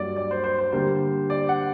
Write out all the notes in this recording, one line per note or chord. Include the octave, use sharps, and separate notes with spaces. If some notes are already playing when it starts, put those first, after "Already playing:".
Already playing: G2 F#3 A#3 D5
D5
C5
C5
C5
D3 G3 A#3 C5
D5
F#5